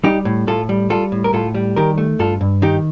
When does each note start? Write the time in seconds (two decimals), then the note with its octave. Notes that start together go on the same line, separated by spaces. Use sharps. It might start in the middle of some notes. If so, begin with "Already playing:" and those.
0.04 G3 D#4 G4
0.25 A2
0.47 A2 F4 A4
0.69 G3
0.90 G3 F4 A4
1.12 A2
1.24 A#4
1.33 A2 F4 A4
1.55 G3
1.76 D#3 G4 A#4
1.98 A3
2.19 G2 F4 A4
2.41 G2
2.62 D#3 D#4 G4